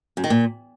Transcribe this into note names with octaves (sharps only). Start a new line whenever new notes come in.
F#2
D#3
A#2